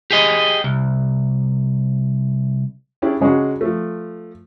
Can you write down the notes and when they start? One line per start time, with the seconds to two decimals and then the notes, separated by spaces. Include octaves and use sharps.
0.11 G4 G#4 D#5
0.64 C2
3.02 C#4 D4 E4 G4 G#4 D5
3.20 C#3 G#3 C#4 D4 F#4
3.61 F3 A3